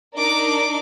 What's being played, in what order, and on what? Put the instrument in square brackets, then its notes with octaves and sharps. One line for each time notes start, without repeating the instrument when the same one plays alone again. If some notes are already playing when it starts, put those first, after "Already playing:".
[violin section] D4 D#4 A#4 D5 D6